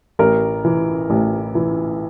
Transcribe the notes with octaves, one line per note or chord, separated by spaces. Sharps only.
A1 A#4
E3
A1
E3